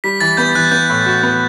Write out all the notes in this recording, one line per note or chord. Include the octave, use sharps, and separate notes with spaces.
G3 B6
E3 A6
B3 G6
E3 F#6
B3 G6
A2
F#4
B3